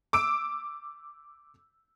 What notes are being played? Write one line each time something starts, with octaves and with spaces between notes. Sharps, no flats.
D6 E6 D7